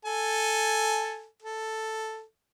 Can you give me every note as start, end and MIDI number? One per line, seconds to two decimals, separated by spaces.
0.05 1.26 69
0.05 1.26 80
1.42 2.23 69